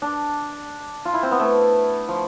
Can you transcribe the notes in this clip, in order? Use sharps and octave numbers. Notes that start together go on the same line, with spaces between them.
D4
F4
E4
C4
B3
A3
F3